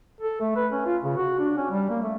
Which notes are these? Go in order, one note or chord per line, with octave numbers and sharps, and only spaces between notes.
A4
A3
B4
C#4
F4
C#3
F#4
D4
C#4
G3
A#3
A3